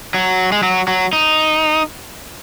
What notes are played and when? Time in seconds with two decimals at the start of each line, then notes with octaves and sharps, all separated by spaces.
0.14 F#3
0.52 G#3
0.63 F#3
0.88 F#3
1.13 D#4